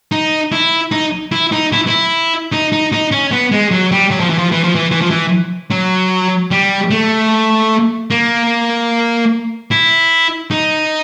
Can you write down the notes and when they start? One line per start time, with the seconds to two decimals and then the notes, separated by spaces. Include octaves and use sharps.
0.12 D#4
0.52 E4
0.91 D#4
1.32 E4
1.52 D#4
1.73 E4
1.87 E4
2.52 D#4
2.72 D#4
2.92 D#4
3.12 C#4
3.31 B3
3.52 G#3
3.71 F#3
3.92 G3
4.11 F#3
4.20 F3
4.29 E3
4.38 F3
4.52 E3
4.64 F3
4.75 E3
4.91 E3
5.01 F3
5.11 E3
5.71 F#3
6.51 G3
6.91 A3
8.10 A#3
9.71 E4
10.51 D#4